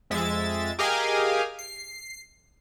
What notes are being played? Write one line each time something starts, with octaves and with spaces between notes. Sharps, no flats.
F2 G#3 E5 A6
G4 G#4 A#4 D#5 F5 G#5
C7